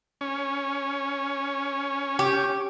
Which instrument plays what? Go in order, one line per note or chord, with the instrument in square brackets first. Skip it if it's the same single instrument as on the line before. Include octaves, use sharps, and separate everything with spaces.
[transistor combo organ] C#4
[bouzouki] G4